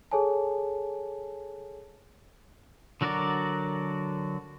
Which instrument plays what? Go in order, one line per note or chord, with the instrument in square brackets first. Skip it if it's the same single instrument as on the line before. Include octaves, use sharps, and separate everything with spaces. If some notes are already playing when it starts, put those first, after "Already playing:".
[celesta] G#4 A4 C#5 G#5 A5
[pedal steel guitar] D3 F#3 F#4 A#4 D5